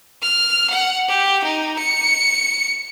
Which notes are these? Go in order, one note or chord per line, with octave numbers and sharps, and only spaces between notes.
F6
F#5
G4
D#4
C#7